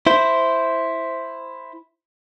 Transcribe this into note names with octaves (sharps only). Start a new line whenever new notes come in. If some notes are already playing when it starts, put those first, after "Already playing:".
E4 C5